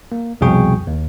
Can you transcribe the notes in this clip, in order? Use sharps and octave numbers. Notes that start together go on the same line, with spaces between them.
A#3
C2 F2 B2 G#4 G5 C#6
D#2